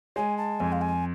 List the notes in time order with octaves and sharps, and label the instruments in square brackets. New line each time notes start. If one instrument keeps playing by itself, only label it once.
[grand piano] G#3 [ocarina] G#5
[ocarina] A5
[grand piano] F2 [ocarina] G#5
[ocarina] F5
G#5